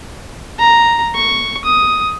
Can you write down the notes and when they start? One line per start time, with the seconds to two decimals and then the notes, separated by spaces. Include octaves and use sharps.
0.59 A#5
1.15 C#6
1.65 D#6